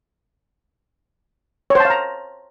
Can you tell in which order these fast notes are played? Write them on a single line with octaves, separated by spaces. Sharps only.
C#5 C5 A5 F5 A#5